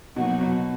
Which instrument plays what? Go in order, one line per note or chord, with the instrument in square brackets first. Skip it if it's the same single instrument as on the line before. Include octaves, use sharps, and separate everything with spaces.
[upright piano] B2 [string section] F#3 A#3 D#4 F#4
[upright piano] B2